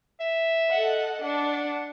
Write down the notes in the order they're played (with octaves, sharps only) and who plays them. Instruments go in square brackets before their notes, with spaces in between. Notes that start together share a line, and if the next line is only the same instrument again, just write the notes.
[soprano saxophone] E5
[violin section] A4 D#5 F#5
[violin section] D4 [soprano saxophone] F#5